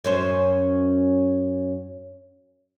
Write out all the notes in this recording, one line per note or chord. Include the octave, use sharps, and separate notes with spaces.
F#2 C#4 C5